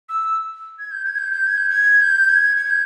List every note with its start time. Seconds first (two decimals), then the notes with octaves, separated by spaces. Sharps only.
0.09 E6
0.79 G#6
0.91 G6
1.05 G#6
1.18 G6
1.32 G6
1.47 G#6
1.57 G6
1.70 G#6
2.01 G6
2.29 G#6
2.57 G#6
2.70 G6